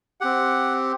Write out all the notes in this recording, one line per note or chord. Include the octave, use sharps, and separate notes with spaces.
C4 G4 F#5